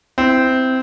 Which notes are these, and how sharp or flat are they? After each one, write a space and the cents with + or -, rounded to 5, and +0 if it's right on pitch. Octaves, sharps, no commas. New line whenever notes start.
C4 -15 E4 +0